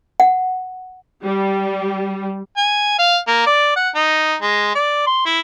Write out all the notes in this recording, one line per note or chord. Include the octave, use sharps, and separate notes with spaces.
F#5
G3
G#5
F5
A#3
D5
F#5
D#4
G#3
D5
C6
E4